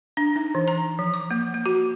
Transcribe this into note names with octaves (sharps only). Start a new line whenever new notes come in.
D4
D#4
E3
A#5
F3
D6
A#3
A#3
F#4